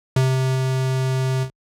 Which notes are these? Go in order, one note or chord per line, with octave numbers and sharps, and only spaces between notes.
C3